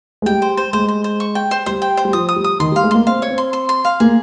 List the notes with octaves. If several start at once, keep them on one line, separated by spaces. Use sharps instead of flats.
G#3
G3 G5
C5
C5
G#3 C5
C5
C5
C#6
G5
C5
G3 C5
G5
C5
G3
F3 D#6
D#6
G3
D#6
D#3 C6
G3
F5
G#3
A#3 C6
C4 F5
C#5
C4
C6
C6
C6
F5
A#3 G#4